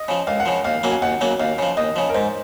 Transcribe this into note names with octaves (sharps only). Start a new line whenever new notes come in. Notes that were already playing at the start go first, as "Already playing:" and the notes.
Already playing: D#5
C#3 F3
C#2 F5
F#5
C#3 F3
D#2 F5
C#3 F#3 A#3
G#5
D#2 F#5
C#3 F#3 A#3
D#2 F5
C#3 F3
D#2 D#5
C#3 F3
A#4
G#2 C5